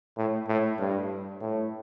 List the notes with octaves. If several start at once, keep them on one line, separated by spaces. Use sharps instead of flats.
A2
A2
G2
A2